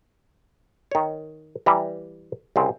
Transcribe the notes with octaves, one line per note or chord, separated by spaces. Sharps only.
D#3 C#5
E3 G3 A#5
C2 C#3 C4